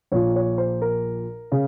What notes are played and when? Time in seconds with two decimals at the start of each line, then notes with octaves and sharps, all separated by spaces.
0.12 A#1 A#2 F3 C#5
0.36 C#5
0.58 C5
0.82 A#4
1.52 C#3